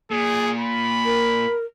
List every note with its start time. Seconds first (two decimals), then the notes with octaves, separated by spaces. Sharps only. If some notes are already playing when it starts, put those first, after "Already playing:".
0.11 A#2 G#4
0.61 B5
1.05 A#4